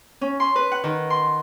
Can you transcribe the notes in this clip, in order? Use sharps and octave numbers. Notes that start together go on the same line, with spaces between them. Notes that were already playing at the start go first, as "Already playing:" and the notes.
C#4
C6
B4
F#5
D#3
C6